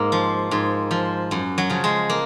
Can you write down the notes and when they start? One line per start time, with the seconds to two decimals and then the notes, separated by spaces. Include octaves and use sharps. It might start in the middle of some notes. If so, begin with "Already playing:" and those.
Already playing: G#2 A#3
0.12 F3
0.51 G#2
0.91 F3
1.31 F#2
1.58 F#3
1.70 C#3 F3
1.84 G#3
2.10 A#3